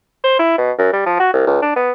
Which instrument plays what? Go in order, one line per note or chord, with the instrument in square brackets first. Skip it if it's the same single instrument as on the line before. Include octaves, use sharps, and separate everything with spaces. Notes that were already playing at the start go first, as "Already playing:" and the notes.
[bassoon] C5
E4
B2
F#2
G3
F3
F#4
C2
C#2
D4
B3